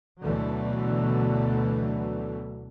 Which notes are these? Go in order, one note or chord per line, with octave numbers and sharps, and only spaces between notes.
D2 B2 D3 E3 F#3 A3